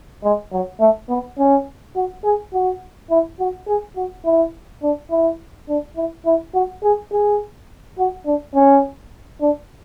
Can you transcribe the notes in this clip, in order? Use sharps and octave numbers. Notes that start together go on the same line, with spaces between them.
G#3
F#3
A3
B3
C#4
F#4
G#4
F#4
E4
F#4
G#4
F#4
E4
D4
E4
D4
E4
E4
F#4
G#4
G#4
F#4
D4
C#4
D4